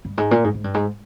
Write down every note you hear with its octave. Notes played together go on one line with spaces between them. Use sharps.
G2
G#2
A#2
G#2
G#2
G2
G#2